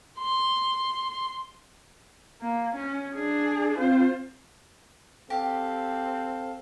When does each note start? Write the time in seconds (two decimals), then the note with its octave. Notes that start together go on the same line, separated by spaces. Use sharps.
0.19 C6
2.42 A#3
2.76 C#4
3.14 D4 G#4
3.79 C4 F4 C5
5.30 C4 G4 A4 F5